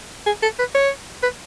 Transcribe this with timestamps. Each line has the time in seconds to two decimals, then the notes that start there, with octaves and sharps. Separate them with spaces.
0.26 G#4
0.42 A4
0.59 B4
0.75 C#5
1.23 B4